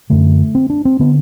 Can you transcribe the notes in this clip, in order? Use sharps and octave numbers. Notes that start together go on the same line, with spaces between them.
F#2 D3 A3
C4
D4
C4
D3 B3